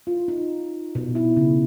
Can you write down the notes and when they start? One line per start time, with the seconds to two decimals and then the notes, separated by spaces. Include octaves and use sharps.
0.07 F4
0.28 D#4
0.95 B2
1.15 E4
1.37 C#3